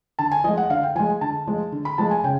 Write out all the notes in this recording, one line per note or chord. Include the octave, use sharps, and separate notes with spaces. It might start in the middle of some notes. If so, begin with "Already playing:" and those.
D3 A5
G#5
F3 G#3 D#5
F#5
D3 F5
G5
F3 G#3 G#5
D3 A5
F3 G#3
D3
B5
F3 G#3 A5
G#5
C#3 G5